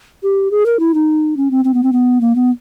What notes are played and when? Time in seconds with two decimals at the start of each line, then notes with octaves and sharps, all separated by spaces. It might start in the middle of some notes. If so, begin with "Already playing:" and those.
0.23 G4
0.51 G#4
0.66 A#4
0.80 E4
0.94 D#4
1.37 C#4
1.51 C4
1.65 C4
1.74 B3
1.83 C4
1.93 B3
2.21 A#3
2.35 B3